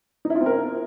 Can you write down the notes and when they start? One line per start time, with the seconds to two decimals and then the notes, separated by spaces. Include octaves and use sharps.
0.25 D#4
0.30 E4
0.35 F4
0.41 C4
0.46 A#4